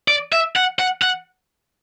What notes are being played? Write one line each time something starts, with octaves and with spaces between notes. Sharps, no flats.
D5
E5
F#5
F#5
F#5